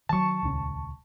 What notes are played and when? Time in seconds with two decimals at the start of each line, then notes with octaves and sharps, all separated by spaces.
0.09 D#3 F#3 A5 C#6
0.43 D#1 C#2 C#4